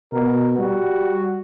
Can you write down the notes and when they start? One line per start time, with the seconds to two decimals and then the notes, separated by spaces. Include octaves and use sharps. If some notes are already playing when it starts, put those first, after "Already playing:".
0.13 B2 A#4
0.58 G3 F#4